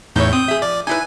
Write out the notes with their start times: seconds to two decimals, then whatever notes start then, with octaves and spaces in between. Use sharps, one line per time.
0.16 E2 A2 D#4 E4 C#5 G6
0.33 C4 D#6 G6
0.48 G#4 E5
0.62 F3 D5
0.87 D#4 E4 B4 G#5